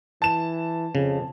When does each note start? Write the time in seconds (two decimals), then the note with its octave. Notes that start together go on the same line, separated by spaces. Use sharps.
0.22 E3 A5 E7
0.95 F2 C#3